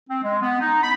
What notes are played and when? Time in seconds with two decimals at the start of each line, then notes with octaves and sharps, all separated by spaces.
0.10 C4
0.23 G#3
0.42 B3
0.60 D#4
0.83 B5